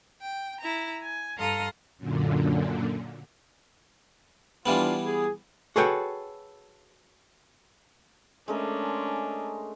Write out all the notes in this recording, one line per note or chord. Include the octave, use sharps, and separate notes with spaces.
G5
E4 A#5
G#5
G2 A4 F5 A#5 C6 D#6
F#2 A#2 D3
E3 G3 B3 D4 F4
G#4
F#4 G#4 A4 B4 C#5 G5
G#3 A3 C#4 D4 A#4